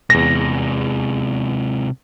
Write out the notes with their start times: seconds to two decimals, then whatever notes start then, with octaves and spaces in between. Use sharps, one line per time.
0.10 E2 C3 G#3 A#6